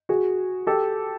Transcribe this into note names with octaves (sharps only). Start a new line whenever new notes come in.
F#4 G#4
G4 A4